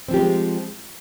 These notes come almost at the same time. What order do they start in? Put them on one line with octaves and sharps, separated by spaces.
C4 F3 G4 A#3 G#3